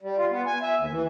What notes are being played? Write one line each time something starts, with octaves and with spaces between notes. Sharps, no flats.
G3
F4
B3
G#5
E5
D#2
E3